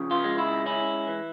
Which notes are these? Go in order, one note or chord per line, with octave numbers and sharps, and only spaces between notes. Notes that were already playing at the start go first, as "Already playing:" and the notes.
Already playing: C#3 F3
F4
G#3
E4
C#4 E4
E3